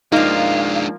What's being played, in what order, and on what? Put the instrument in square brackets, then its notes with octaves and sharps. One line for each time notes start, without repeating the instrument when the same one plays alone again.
[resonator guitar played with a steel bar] F3 A#3 [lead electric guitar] G#3 D4 [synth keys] D#4 [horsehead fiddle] F5